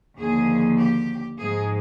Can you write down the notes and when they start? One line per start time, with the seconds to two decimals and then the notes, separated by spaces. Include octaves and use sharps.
0.17 D#2 D3 F3 G#4
0.78 G4
1.38 G#2 F3 G#3 G#4